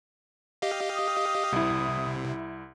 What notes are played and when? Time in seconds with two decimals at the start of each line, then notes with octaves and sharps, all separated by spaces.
0.62 G4 D#5 F5
0.95 D#6
1.53 C2 C3 E4